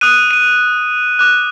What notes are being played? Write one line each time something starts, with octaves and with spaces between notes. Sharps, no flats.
D#6 F#6 D#7
D#7
D6 F#6